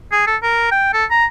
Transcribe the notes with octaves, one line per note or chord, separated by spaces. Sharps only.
G#4
A4
A#4
G5
A4
A#5